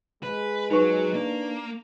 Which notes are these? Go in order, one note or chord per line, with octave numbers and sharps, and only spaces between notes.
G#3 B4
F#3 D#4 B4 C#6
A#3 D4